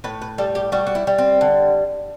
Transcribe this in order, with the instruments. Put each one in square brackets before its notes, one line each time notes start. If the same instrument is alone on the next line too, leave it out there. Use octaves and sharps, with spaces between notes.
[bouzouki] A2 B4
B4
G3 A4
G4
G3 F#4
F#4
E4
G3
C4
D3